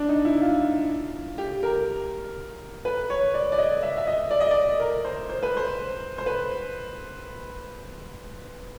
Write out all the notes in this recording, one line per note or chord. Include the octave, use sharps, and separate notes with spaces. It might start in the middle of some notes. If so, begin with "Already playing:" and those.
Already playing: D4
D#4
E4
F4
G4
A#4
B4
C#5
D5
D5
D#5
E5
E5
D#5
D5
D#5
D5
A#4
C5
C5
B4
C5
C5
B4